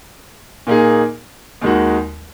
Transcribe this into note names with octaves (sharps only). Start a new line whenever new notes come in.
A#2 A#3 D#4 G#4
D#2 D#3 G#3 D#4 F#4